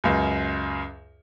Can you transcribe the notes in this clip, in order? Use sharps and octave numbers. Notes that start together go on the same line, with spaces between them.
C#2 F#2